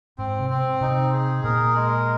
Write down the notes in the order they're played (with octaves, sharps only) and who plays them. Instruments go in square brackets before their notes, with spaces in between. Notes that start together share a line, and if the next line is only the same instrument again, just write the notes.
[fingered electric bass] G#2 [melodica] C4
[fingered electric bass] C3
[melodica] C4
[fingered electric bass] C3 [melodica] D#4
[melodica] G#4
[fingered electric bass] A#2 [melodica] A#4
[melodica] G#3